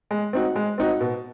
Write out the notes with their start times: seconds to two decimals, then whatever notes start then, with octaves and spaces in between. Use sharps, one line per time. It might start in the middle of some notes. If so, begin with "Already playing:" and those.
0.11 G#3
0.33 C4 D#4 F#4
0.56 G#3
0.78 C4 D#4 F#4
1.01 B2